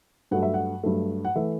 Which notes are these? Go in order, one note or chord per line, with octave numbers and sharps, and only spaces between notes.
G2 F#3 A3 F#5
E5
F#5
G2 F#3 A3
F#5
E3 A3 E5